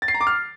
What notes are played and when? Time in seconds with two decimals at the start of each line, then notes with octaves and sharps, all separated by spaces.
0.02 A6
0.08 C7
0.14 A#5
0.21 D6
0.27 F6